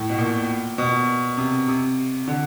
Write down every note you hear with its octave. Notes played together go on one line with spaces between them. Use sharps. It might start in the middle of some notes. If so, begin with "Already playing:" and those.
Already playing: A2
B2
A#2
B2
C3
C3
D3